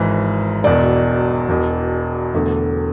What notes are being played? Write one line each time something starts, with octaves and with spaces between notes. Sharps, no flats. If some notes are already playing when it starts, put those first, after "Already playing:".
Already playing: G#1 G#2 E3
E1 E2 B2 D5
E1 E2 B2
E1 E2 D3 A3